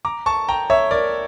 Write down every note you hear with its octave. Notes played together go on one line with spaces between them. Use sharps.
A#5 D6
A5 C#6
G5 A#5
C#5 E5
A#4 D5